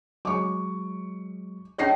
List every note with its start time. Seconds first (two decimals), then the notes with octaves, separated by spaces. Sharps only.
0.25 F#3 G#3 C#6 D6
1.78 C#4 D#4 G#4 C#5 D#5 A#6 C7